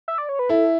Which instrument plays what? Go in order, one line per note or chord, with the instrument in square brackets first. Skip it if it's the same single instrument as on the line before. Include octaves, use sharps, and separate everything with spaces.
[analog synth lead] E5
D5
C#5
B4
[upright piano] E4 [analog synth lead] A4